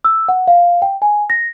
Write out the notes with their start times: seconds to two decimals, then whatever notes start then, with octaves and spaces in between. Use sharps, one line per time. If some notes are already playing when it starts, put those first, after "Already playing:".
0.05 E6
0.28 F#5
0.47 F5
0.82 G5
1.02 G#5
1.30 A#6